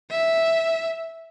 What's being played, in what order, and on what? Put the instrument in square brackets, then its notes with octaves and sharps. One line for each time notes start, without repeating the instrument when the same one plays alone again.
[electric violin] E5